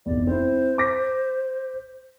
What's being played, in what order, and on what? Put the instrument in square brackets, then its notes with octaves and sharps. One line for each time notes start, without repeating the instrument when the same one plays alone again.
[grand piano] F1 E2 [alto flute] D5
[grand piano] C4 E4 [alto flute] C5
[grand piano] D6 A#6 B6